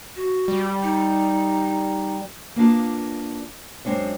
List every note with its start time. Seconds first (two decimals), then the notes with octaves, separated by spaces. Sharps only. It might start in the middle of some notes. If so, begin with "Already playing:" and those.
0.16 F#4
0.48 G3
0.83 D#4
2.56 A#3 B3 D4 F4
3.85 F#2 G#3 C4 D4 C#5